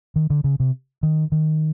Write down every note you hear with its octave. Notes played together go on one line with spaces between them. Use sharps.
D#3
D3
C#3
C3
D#3
D#3